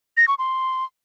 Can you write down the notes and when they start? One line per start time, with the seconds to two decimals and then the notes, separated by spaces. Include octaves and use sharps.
0.17 A#6
0.28 C#6
0.39 C6